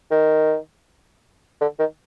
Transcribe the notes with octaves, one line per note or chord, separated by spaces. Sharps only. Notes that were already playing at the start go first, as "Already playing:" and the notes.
D#3
D3
D#3